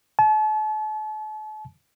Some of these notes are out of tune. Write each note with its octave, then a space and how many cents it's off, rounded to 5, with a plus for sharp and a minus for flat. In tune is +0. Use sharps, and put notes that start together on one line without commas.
A5 -40